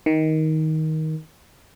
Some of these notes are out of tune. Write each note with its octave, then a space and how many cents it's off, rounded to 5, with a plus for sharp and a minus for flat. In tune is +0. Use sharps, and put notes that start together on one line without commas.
D#3 +15